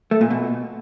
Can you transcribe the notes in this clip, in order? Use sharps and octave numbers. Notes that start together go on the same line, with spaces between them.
A3
A#2
B2